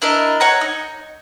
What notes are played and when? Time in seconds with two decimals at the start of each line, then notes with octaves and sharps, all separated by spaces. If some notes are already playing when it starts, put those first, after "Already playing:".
0.02 D4 E4 A#4 D#5
0.40 C#5 F#5 A#5
0.61 D#4